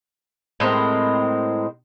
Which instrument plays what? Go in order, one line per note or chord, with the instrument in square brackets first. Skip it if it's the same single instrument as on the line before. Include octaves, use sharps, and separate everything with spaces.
[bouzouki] A2 G#3 C4 A#4